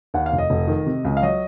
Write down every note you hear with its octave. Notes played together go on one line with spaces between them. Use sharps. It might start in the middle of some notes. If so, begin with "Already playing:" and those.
D#2 F#5
F5
F1
D#5
F1
D#3
C3
C#2
F5
F#3 D#5